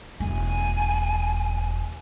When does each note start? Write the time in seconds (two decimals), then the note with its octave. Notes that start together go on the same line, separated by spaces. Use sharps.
0.20 E1 A3 G#5